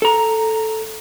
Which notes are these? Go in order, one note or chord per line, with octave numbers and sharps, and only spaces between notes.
A4 A#5